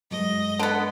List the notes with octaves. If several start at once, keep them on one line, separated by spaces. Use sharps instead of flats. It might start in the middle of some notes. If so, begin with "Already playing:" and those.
G2 F#3 G#3 D#5
D3 B3